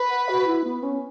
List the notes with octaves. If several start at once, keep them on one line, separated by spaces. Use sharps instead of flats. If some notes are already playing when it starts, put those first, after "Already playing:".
Already playing: B4
F#5
F#4
E4
B3
C#4